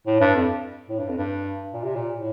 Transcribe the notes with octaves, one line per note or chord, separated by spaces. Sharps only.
A2
G2
F2
A2
G2
F2
G2
A#2
C3
A#2
A2